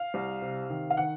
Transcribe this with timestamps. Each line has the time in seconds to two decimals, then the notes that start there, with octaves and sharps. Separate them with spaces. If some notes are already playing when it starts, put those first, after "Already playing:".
Already playing: F5
0.14 C2
0.42 C3
0.70 D#3
0.90 F5
0.97 D#3 F#5